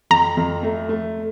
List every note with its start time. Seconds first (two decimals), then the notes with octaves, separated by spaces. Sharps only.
0.11 F2 A#5
0.37 F2
0.63 A3
0.89 A3